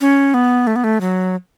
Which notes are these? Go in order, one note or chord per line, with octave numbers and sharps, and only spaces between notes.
C#4
B3
A3
B3
A3
F#3